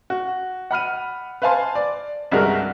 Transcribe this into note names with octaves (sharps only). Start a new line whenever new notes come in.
F#4
F#5 B5 F6 D#7
B4 C5 F5 G#5 A5 C6
D5
C2 G2 G#3 F#4 A#4